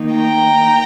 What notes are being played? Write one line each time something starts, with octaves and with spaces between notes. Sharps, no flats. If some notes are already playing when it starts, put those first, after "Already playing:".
Already playing: D#3 A#3 D#4
G5 A#5